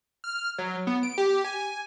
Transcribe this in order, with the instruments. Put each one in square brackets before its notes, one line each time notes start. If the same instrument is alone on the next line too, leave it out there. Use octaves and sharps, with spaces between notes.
[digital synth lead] F6
F#3
B3
D7
G4
G#5